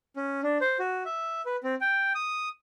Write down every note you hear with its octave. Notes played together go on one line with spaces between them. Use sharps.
C#4
D4
C5
F#4
E5
B4
C4
G5
D#6